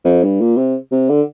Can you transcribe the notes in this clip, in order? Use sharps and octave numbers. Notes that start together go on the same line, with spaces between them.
F2
G2
A#2
C3
C3
D3